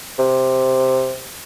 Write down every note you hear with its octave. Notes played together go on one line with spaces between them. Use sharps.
C3